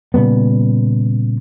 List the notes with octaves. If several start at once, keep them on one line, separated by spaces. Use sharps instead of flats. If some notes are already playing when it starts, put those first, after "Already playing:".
A#2 C#3 G3 B3